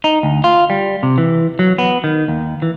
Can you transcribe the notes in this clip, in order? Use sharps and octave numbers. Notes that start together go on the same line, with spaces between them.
D#4
D2
F4
G3
C3
E3
F#3
B3
D#3
D#2
E3